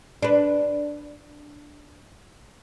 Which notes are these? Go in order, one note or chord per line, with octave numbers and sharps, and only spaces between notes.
D4 B4